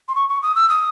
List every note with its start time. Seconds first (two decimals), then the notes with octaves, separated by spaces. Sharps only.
0.08 C6
0.15 C#6
0.29 C#6
0.42 D#6
0.56 E6
0.69 D#6